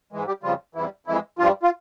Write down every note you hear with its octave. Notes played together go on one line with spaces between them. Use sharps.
G#2 E3 G#3
G3 G4
F2 C#3 F3 G3 F4
E2 C3 E3 G3 E4
F2 E3 G#3 E4
G2 F3 G3 F4
F4